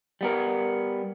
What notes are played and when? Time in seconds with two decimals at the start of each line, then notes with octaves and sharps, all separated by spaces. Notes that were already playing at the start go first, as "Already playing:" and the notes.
0.21 G3 B3 A#4